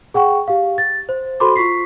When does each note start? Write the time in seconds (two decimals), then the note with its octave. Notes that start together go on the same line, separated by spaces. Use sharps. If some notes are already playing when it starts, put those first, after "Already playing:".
0.14 G#4 F#5 G5 C#6
0.48 G4 F5
0.78 A6
1.09 C5
1.40 F#4 A4 C5 B5 C6 D6
1.56 F4 C#6 B6 C7